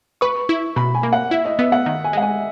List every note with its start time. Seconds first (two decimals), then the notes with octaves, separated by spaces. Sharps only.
0.21 B4 C#6
0.49 E4
0.76 B2 B5
0.95 G#5
1.03 A#3
1.13 F#5
1.31 E4 E5
1.45 D#5
1.59 B3 E5
1.72 F#5
1.86 D#3
2.04 G#5
2.13 G#3 F#5
2.22 G#5